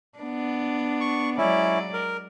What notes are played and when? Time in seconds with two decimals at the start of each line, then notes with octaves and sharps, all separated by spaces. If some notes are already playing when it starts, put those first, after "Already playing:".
0.19 B3 D4
1.00 C#6
1.38 F#3 G#3 C#4 E4 D5
1.93 A#4